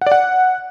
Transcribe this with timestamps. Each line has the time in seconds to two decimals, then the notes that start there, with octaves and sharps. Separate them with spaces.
0.01 F#5
0.07 D5
0.12 F#5